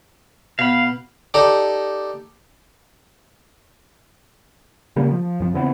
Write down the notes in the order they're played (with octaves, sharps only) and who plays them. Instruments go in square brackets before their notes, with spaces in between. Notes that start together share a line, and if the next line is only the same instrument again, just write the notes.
[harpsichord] B2 [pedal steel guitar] F5 B5
[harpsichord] D#4 G4 A4 D5
[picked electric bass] C#3 G3 A#3
F3
F2 F3
C#3 E3 B3 C4